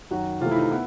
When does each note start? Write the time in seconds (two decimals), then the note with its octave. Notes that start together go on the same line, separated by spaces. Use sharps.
0.11 F#2 D#3 F#3 F#4
0.41 C3 E3 A3 F4
0.51 E4
0.56 D#4
0.71 B3 E4